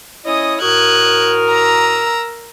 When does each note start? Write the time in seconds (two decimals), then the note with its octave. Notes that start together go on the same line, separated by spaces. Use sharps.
0.25 C#4 E4 C#5 D#5 D#6
0.62 A2 F#4 A#4 D#6 F#6 G#6
1.51 A#5 E6